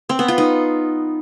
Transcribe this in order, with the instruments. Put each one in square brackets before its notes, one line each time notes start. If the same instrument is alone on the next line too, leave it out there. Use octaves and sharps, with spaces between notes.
[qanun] C4
B3
F4
D#4